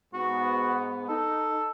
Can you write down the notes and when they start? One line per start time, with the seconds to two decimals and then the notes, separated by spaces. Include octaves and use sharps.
0.14 G#2 B3 F#4
1.09 D#4 A4